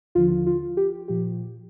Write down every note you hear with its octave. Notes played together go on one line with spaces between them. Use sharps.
D#2 D3 F3 F4
F4
G4
A#2 F3 G4